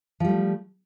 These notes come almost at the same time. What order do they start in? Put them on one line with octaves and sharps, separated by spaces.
F3 G3 A3